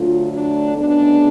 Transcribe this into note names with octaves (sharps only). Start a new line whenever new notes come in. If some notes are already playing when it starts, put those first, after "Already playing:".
Already playing: D2 D3 F#3 A3 F4
D4
D2 C#3 G#3 B3 D4